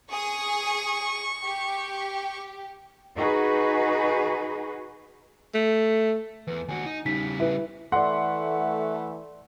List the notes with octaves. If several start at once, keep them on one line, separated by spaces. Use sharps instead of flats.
G#4 C#6 D#6
G4
D#4 F#4 G#4 B4
A3
E2 B4
D#2 F#4 G#5
D#4
C#3 G3 D#4 B6
E4 B4 E5
E3 A3 D5 F#5 C6